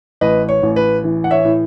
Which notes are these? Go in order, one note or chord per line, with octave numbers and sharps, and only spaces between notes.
A1 B4 D#5
C#5
A1
B4
E3
F#5
C#5 E5
A2